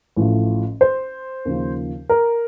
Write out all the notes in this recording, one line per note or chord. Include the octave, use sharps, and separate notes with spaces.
A1 A2 F3
C5
D#2 C#3 F3
A#4